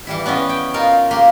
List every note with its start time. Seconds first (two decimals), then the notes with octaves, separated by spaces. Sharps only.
0.07 E3 G3 E4
0.26 B3 C#4 E4 D#5
0.49 G5
0.74 D#4 F4 A#4
1.11 A#3 G4 C6